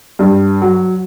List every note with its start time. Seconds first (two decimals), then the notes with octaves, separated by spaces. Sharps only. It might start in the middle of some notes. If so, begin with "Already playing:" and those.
0.19 G2
0.62 F#3